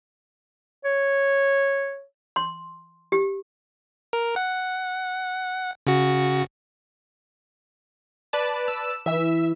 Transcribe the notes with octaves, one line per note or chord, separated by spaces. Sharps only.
C#5
C6
G4
A#4
F#5
C#3 F#4
B4 D5 A5
E6
E3 E5 E6